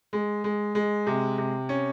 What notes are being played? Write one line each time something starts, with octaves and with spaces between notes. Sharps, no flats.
G#3
G#3
G#3
C3
C3
C#4